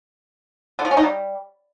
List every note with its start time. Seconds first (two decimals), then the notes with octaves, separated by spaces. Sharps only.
0.79 D3
0.85 F3
0.91 C#4
0.97 D#4
1.03 G3